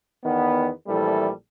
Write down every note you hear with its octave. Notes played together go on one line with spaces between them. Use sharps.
E2 D#3 B3
A#1 E3 G3 A3 A4